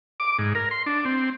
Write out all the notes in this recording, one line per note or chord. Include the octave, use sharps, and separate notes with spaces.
D6
G#2
A#4
C6
D4
C4